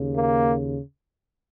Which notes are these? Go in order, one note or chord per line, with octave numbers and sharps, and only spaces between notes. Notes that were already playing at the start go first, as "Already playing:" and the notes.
Already playing: D#2 C#3
A#3